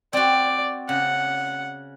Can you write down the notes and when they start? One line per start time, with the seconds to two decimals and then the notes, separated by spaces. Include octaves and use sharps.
0.13 C4 F#4 D5
0.89 C#3 F#5